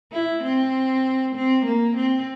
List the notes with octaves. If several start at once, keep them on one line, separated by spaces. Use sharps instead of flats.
E4
C4
C4
A#3
C4